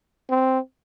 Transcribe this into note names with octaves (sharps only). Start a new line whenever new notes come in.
C4